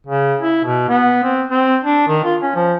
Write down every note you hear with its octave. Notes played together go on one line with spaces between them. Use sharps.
C#3
E4
B2
B3
C4
C4
D4
D#3
F4
C#4
F3